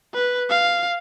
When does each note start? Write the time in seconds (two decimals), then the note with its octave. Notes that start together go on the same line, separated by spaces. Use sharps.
0.14 B4
0.50 F5